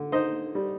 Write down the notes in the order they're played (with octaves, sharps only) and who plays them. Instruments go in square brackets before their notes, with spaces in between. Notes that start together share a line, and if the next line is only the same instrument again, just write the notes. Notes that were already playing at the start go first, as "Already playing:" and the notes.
Already playing: [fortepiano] D3
D#4 C5 D#5
G3